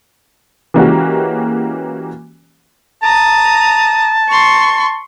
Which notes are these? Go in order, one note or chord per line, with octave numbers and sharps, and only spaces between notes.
E3 G#3 A#3 C#4 F#4 G4
A5 A#5 D#6
C6 C#6